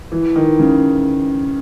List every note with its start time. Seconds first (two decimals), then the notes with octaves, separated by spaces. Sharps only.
0.12 E3
0.36 D#3
0.59 C#3